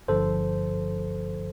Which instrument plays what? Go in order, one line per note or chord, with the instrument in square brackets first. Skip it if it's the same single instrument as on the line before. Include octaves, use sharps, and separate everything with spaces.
[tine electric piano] G1 G2 D3 F3 A4 C5